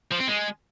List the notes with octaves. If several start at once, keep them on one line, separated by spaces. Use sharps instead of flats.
F3
C4
G#3